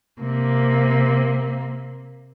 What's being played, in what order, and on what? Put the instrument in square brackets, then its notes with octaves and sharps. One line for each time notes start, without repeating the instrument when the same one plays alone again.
[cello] C3 A#3